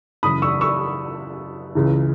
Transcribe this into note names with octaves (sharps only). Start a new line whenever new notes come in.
F#2 C#3 E3 B5 D#6
C#6 E6
C#6 E6
C#2 C#3 E3